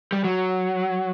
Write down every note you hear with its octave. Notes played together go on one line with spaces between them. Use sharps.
G3
F#3